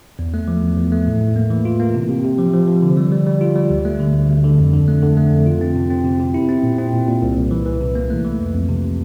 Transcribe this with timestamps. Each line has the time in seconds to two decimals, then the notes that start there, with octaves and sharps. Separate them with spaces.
0.19 E2
0.34 A3
0.48 F3
0.63 E2
0.77 E2
0.92 A3
1.07 A2
1.22 A2
1.36 A#3
1.50 E3
1.65 F4
1.80 A#3
1.94 C3
2.09 C3
2.24 C3
2.39 F3
2.53 F3
2.68 F3
2.83 D3
2.97 G3
3.12 G3
3.26 G3
3.41 F4
3.56 G3
3.70 D2
3.85 A3
4.00 D3
4.14 D2
4.29 D2
4.44 D3
4.58 F2
4.73 D3
4.88 A3
5.02 D3
5.17 A3
5.32 F2
5.46 F4
5.61 C4
5.76 C3
5.90 C4
6.05 C3
6.20 C3
6.34 E4
6.49 C4
6.63 A#2
6.78 C4
6.93 A#2
7.07 A#2
7.22 C2
7.37 C2
7.51 E3
7.66 E3
7.81 C3
7.95 A#3
8.10 A3
8.25 E3
8.39 F2
8.54 F2
8.69 C3